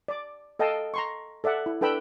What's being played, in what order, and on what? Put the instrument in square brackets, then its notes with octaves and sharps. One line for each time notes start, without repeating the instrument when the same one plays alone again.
[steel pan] D5 D6
A4 D#5 F5 G5 A5
A#5 C6 C#6
A4 D5 E5 F#5
E4
D4 A4 B4 G5 B5 E6